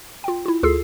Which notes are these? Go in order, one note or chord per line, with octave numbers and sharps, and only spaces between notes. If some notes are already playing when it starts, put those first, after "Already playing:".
F4 G5
E4 F4
D2 F4 G#4 A4 E6 C7